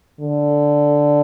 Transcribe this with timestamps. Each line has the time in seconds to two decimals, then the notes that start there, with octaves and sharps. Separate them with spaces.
0.21 D3